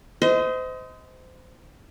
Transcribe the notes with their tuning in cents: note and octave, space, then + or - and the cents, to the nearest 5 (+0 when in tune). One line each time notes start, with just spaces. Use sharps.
C5 -30 D#5 +25